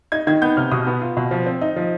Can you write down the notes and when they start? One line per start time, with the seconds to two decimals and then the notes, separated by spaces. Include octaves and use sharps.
0.12 D#4 G#6
0.27 D#3 G#6
0.42 B3 G6
0.57 C3 F6
0.71 B2 D#6
0.87 B3
1.02 F4
1.17 B2
1.31 F3
1.46 C4
1.61 D#4
1.76 F3